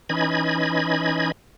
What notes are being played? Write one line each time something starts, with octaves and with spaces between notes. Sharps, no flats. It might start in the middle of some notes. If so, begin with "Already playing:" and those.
E3 C#4 D#4 D#5 B5 G#6